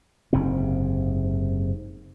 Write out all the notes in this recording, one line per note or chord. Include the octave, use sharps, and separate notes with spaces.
F#1 G#2 C3 C4